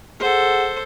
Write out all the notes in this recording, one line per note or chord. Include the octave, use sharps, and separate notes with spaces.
G#4 A4 C5 F#5